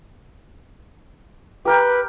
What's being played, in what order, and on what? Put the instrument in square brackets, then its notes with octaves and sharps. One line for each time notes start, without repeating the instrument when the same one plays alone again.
[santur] G4 A#4 G5 [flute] B4